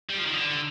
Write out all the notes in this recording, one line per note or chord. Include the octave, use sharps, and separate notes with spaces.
G3
F3
D#3
D3